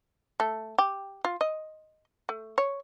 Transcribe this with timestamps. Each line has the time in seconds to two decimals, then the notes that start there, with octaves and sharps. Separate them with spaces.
0.40 A3
0.78 G4
1.25 F4
1.41 D#5
2.29 A3
2.58 C#5